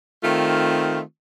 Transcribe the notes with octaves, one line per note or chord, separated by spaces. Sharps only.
D#3 A3 C4 F4